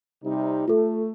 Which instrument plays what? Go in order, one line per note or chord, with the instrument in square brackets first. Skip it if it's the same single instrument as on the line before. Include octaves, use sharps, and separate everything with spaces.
[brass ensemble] C3 G3 D#4
[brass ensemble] A3 [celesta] F4 A4